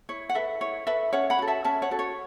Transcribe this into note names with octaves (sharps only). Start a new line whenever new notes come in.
E4 C#5
F#5
A4 B4 E5
E4 C#5
A4 B4 E5
C#4 C#5 F#5
F#5 B5
F#4 A4
E5 A5
C#4 E5 A5
C#5 F#5
F#4 A4
C#5